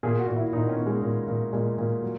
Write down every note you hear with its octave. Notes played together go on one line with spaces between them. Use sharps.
A#2 G#4
F#4
A#2
E4
A#2 D#4
B3
C#4
A#2
G#3
A#2
A#2
A#2 G#3
A#2
F#3